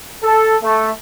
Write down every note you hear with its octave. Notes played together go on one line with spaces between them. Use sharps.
A4
A3